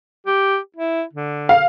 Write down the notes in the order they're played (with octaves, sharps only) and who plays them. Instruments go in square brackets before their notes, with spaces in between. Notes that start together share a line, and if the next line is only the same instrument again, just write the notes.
[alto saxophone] G4
E4
D3
[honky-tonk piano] F5